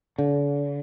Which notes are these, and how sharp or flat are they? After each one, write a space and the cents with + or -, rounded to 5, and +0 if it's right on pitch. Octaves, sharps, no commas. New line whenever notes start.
D3 -40